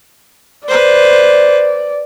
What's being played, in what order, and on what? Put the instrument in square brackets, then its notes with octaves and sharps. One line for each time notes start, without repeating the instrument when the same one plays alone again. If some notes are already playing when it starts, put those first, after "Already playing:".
[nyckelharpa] B4 C5 [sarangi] D5